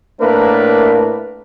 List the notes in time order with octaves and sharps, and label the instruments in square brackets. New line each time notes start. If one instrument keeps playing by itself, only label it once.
[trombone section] A2 A3 A#3 D4 A#4 B4